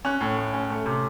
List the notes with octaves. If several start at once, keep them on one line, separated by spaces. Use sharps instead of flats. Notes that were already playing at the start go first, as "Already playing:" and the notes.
C#4 F#6
A2
A2
C#4
A3
C3